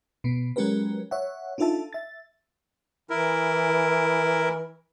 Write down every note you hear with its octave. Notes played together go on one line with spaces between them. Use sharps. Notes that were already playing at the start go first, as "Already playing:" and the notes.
B2 B3
F#3 G#3 C#4 G4 A#4 B4
C#5 E5 F#5
D4 D#4 F4 A4 E5 A5
E5 A6
E3 E4 A#4